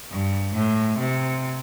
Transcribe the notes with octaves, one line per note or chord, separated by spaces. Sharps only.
G2
A2
C3